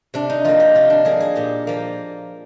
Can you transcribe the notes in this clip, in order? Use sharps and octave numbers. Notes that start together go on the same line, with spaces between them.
C3 D4
D#4
F3 A#3 F4
G4
C3 F4
D4
F3 A#3 G#4
G#4
A#2 G4
F3 A#3